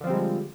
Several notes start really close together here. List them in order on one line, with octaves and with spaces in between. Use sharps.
D3 F3 C4 G3 G#3